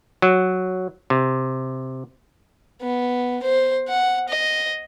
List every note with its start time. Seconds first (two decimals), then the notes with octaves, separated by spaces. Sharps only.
0.22 F#3
1.10 C3
2.82 B3
3.43 C5
3.88 F#5
4.29 D#5